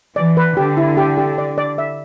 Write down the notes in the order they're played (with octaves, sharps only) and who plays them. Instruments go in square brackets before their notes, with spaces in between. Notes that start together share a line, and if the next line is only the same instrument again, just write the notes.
[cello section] E3 [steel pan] D5
[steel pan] B4
[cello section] D3 [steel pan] G4
[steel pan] E4
G4
G4
D5
D5
E5